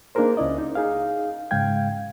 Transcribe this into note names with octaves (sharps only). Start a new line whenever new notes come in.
A#3 D4 D#4 G#4 A#4 C5
C#2 C#4 E4 D5 D#5
D#4
D#4 G#4 F5
G#2 C#3 G#3 F5 G5 G#6